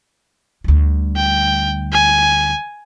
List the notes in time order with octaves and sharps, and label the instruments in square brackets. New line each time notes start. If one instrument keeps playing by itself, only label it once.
[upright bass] D2 G3
[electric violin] G5
G#5